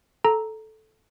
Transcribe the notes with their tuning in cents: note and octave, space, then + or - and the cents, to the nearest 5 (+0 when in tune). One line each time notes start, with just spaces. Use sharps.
A4 -10 A#5 +0